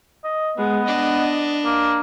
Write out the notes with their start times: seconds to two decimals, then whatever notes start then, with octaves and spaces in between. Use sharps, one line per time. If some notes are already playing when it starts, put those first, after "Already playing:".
0.24 D#5
0.58 G#3 B3
0.87 D4 D#5
1.65 A#3